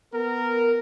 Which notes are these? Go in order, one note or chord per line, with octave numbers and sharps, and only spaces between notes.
B3 A#4